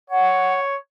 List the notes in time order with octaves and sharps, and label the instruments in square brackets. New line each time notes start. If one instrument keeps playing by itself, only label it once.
[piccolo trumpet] C#5 [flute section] F#5